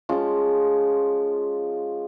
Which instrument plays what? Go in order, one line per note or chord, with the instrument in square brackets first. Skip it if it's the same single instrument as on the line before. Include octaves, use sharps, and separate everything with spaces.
[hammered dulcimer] F3 G#3 C#4 F4